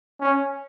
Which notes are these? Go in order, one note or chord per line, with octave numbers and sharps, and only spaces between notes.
C#4